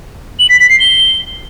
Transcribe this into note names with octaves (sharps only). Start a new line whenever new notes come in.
F#7
B6
B6
C7
G7